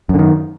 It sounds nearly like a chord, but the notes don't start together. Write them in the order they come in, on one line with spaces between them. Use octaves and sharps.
F#2 D3 D#3